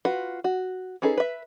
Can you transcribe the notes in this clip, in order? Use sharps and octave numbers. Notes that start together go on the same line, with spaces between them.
F4 F#4 B4
F#4
C#4 D#4 G#4 A4 B4
B4 E5